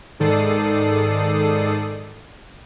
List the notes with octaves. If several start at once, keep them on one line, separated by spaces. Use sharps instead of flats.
G#2 D#3 A4 D5 D#6 C7